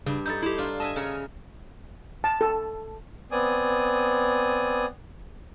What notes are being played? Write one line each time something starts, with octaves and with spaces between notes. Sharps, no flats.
G2 C#3
D#4 E4 A4 G6 A6
E4 G4 C5
D4 F4
D#5 E5 G#5 A5
C#3 A#4 C#5
A5
A4
B3 C4 D5 G#5 D#6